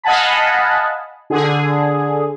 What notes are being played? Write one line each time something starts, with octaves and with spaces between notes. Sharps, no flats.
D#5 F5 F#5 G#5 A5 B5
D3 G#4